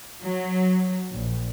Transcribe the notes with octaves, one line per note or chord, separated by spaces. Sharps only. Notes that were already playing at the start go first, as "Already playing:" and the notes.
F#3
A#1